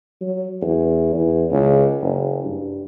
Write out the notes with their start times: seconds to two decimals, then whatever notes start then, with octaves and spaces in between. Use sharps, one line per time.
0.21 F#3
0.62 E2
1.14 E2
1.50 C#2
2.02 F#1
2.44 G2